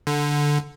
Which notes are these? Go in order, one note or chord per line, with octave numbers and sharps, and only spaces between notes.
D3